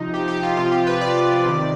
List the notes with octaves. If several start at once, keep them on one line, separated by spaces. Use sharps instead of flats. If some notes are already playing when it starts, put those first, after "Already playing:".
Already playing: C3 F3 D#4
G4
G4
F4
C3 F3 F4
G4
B4
D5
C3 D#3